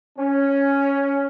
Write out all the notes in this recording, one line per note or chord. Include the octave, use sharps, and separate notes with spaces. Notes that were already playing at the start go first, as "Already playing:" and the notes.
C#4